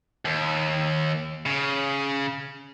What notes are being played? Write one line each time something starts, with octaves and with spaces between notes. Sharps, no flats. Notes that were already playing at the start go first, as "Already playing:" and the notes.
D#2
C#3